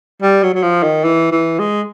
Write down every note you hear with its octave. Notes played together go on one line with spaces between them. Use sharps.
G3
F#3
F#3
F3
D#3
E3
E3
G#3